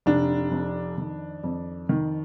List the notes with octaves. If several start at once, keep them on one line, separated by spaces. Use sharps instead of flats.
F1 D4
F2
D#3
F2
D#3